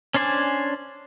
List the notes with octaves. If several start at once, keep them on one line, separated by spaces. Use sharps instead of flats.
C#4 D4 C5 D5 G#5